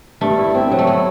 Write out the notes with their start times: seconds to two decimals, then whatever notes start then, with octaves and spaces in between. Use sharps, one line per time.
0.21 G2 A3
0.39 E4
0.54 C4
0.71 F#3
0.79 A3
0.87 B3